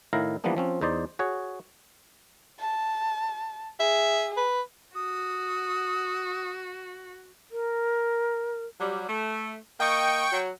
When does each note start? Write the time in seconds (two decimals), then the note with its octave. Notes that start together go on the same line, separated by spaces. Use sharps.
0.13 A2 D#3 E4 F5 A#5
0.44 E3 F3 G3 A#3 B3 D4
0.57 F3 C4 C#4
0.81 E2 D#4 C5 D5
1.19 F#4 G#4 C#5
2.60 A5
3.80 G#4 E5
4.37 B4
4.95 F#4 D#6
7.51 A#4
8.80 F#3 G3
9.09 A3
9.80 A#3 D#5 G5 C#6
10.31 F#3